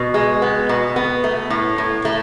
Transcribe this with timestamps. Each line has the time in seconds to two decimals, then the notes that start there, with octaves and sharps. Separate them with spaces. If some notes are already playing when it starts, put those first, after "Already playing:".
Already playing: B2
0.14 G#3
0.42 B3
0.69 B2
0.96 B3
1.24 A3
1.50 A2
1.78 A2
2.05 A3